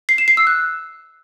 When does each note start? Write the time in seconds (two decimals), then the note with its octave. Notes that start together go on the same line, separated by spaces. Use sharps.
0.09 C7
0.18 E7
0.28 C7
0.37 E6
0.47 F#6